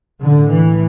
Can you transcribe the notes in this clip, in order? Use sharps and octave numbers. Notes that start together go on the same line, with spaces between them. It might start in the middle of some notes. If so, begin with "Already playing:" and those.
A2 D3
E3